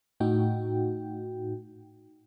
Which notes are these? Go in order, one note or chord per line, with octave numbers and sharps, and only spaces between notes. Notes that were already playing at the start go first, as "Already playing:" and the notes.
A2 D#4 F#4 G5